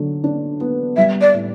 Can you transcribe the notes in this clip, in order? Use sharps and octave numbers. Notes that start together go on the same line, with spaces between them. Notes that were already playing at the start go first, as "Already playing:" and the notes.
Already playing: D3 F#3
D4
B3
G3 E5
D5
A2